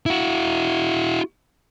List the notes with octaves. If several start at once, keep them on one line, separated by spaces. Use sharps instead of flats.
E4 F#4